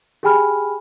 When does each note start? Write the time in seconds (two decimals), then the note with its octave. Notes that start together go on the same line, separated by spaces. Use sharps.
0.23 G4 G#4 G5 G#5 B5 F6